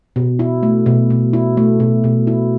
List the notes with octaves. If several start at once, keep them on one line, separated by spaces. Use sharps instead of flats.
B2
E4
A3
B2
B2
E4
A3
B2
B2
E4